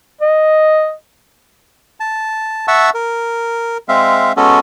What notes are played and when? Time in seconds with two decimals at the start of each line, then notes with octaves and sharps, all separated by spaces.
0.21 D#5
2.00 A5
2.68 E5 F#5 A5 C#6 E6
2.94 A#4
3.88 G#3 C4 E5 F5
4.37 G#3 B3 C#4 F#4 A4